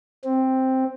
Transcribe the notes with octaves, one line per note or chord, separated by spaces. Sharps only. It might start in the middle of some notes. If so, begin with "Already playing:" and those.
C4